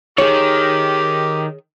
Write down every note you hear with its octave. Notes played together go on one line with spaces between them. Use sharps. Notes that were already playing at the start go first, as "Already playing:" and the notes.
D#3 G4 G#4 C#5